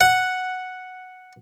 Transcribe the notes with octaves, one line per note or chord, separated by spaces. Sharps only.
F#5